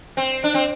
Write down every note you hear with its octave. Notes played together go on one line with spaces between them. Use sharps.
C4
D4
C4